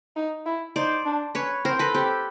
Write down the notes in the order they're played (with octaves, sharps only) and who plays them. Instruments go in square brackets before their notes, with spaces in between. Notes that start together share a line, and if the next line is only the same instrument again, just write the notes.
[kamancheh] D#4
E4
[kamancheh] D#4 [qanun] C5 D5
[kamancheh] D4
[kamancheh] C#4 [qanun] B4 C#5
[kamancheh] C4 [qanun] A#4 C5
[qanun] A4 B4
[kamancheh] C4 [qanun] G4 A4